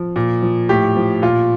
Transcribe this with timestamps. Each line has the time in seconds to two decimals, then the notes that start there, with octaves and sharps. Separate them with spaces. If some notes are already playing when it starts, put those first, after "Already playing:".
Already playing: F3
0.16 A#2
0.42 F3
0.69 A2 G4
0.96 F3
1.22 A#2 F4